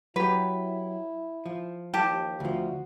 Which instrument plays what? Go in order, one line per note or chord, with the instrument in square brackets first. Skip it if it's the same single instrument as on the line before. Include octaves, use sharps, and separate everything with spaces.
[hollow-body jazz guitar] F#3 G4 [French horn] E4 [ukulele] B4
[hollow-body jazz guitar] F3
[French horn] D#2 [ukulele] G4 A5
[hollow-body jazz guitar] D2 F3 [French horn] F#4